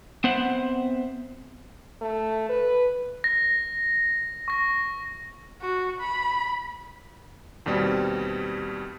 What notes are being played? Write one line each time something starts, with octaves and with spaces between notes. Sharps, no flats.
B3 C4 C5 E5 F#5
A3
B4
A#6
C#6 A#6
F#4
B5
D#2 B2 G3 C4